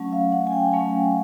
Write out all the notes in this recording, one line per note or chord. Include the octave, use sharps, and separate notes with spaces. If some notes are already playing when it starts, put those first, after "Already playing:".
Already playing: F#3 A3 C#4
F5
F#5
G#5
G5
F#3 A3 C#4 G#5